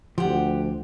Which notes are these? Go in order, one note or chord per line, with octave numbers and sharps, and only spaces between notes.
D2 F3 G4 F#5